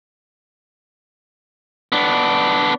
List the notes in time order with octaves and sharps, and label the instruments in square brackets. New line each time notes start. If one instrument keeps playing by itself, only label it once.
[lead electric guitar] B3 D4